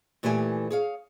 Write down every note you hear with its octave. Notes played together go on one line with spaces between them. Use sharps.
A#2 E3 A3 E4 G4 G#5
G#4 C#5 F5